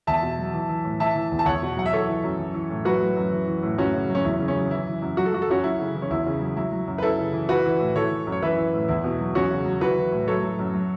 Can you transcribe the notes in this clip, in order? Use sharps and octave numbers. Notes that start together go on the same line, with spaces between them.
E2 E5 A5
B2
F#3
E3
E3
A2
E3 E5 A5
E3
E2
A5
E2 C#5 F#5
B2
F#3 F#5
E5
E3 A4 C#5
E3
F#2
E3
E3
A2
F#3 F#4 B4
F#3
F#2
E3
E3
A2
F#2 C#4 F#4
C#3
F#3
C#4
E2 E4
C#3
C#4
F#3
E3 E4
E3
F#2
F#3 F#4
A4
F#3 F#4
A4
F#2 C#4 F#4
F#2 E4
C#3
E3
C#4
E2 E4
C#3
F#3
F#3 E4
F#3
F#2
B4
F#2 E4 A4
C#3
E3
E3 F#4 B4
E3
A2
E3 A4 C#5
E3
F#2
C#5
E3 B4 E5
E3
A2
E2 E4
B2
F#3
E2 C#4 F#4
C#3
F#3
E3 F#4 B4
E3
A2
F#3 A4 C#5
F#3
F#2
F#3